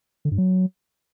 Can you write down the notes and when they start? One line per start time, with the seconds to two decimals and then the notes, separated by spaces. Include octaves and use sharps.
0.25 D3
0.31 G2
0.38 F#3